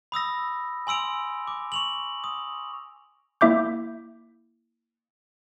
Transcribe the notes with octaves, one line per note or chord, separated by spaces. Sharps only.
B5 D#6 E6 A#6
G#5 C6 E6 D7 F7
D6
C#6 F7 F#7
D#6
A#3 E4 E5 D6 G6